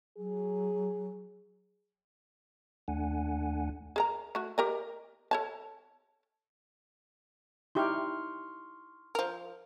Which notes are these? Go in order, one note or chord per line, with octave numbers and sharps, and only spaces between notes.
F#3 G#4
D#2 A3 D4 F#5 G#5
G#4 A#4 A#5
A3 F#4
G4 A#4 D#5
A4 C#5 A5
D#4 E4 G4 C6 C#6 F6
F3 A#4